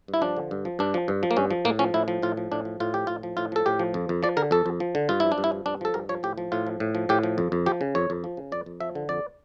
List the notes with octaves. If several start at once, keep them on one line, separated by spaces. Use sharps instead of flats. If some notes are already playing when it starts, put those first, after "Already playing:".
G2
E4
F3 D4
D3
G2
F3
G2 D4
F3
G2
F3
A#3
G2 C#4
F3
A2 A#3
F3 C#4
A2 E4
F3
A2 F4
F3
A2 D4
F3
A2 F4
F3 G4
A2 F4
F3
A2 F4
F3 A4
A2 G4
F3
F2
F2
F3 D5
D3 A#4
F2 A4
F2
F3
D3
G2 F4
F3 E4
D4
G2
E4
F3
G2 D4
F3 A4
G2 A#4
F3 C#5
A2 G4
F3
A2 F4
F3
A2
F3
A2 G4
F3
F2
F2
F3 G4
C#3
F2 C#5
F2
F3
C#3
F2 D5
F2
F3 E5
D3
F2 D5